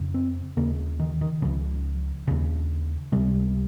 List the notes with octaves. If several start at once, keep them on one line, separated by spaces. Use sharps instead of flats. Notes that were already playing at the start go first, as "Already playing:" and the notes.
Already playing: F2 C#3
C4
D#2 C#3 A#3
D#3
D#3
C#2 C#3 F3
D#2 C#3
C#2 C3 G3